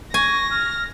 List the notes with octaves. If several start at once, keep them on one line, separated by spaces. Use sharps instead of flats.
G#5 C#6 A#6
F6